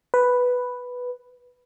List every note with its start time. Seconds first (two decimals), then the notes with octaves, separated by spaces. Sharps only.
0.14 B4